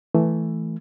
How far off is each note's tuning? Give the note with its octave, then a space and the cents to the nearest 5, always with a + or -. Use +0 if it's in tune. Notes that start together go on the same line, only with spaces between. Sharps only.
E3 +0 A3 +0